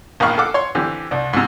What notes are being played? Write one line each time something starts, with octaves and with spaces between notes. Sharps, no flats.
A#1 E2 D#3 F5 B5 C#6
A4 F5 F#5 D6
C#5 C6
D3 E3 C4 G4
C2 D4
G#2 C3